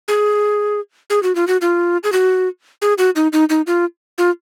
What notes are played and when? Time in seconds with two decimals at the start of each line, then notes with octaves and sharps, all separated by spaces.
0.08 G#4
1.10 G#4
1.23 F#4
1.35 F4
1.47 F#4
1.61 F4
2.04 G#4
2.12 F#4
2.82 G#4
2.98 F#4
3.16 D#4
3.33 D#4
3.50 D#4
3.67 F4
4.18 F4